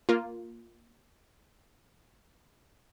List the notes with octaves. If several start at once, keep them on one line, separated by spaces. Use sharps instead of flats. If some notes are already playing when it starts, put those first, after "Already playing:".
A#3 F4